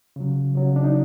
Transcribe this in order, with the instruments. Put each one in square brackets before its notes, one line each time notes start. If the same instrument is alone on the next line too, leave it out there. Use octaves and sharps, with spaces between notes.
[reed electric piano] C#3 F#3
C#3 F#3
D4
D#4